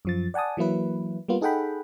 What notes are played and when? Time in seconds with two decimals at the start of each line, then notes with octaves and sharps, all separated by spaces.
0.05 F#2 F3 A6
0.34 D5 F#5 G#5 A5 D#6
0.57 E3 F#3 A#3 E4 B4
1.28 G3 A#3 B3 F4
1.41 D#4 G#4 A4 F#5 G5 B5